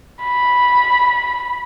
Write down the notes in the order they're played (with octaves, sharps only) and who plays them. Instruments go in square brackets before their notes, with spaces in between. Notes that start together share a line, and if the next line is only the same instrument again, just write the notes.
[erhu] B5